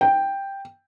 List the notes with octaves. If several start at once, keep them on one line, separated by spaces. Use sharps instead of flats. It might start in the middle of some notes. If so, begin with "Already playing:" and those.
G5